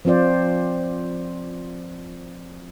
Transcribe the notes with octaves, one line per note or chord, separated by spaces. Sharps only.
F3 C4 F4 C5 D5